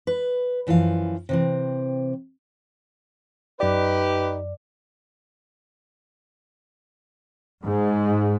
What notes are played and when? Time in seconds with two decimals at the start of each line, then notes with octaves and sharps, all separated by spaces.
0.07 B4
0.67 F#2 E3 F3 F#4 F5
1.29 C3 E3 C4
3.60 F#2 D#4 G4 B4 D5
7.64 G#2